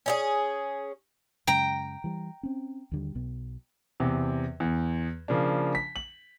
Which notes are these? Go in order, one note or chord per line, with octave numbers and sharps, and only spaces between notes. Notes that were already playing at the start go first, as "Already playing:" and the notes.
C#4 D#4 G#4
F#2 C#3 G#3 G5 A#5
E3 G3
C4 C#4
D#2 D3 G3
B1 B2
E2 C3
E2
C#3 F3 A#3 D4
B6
F#7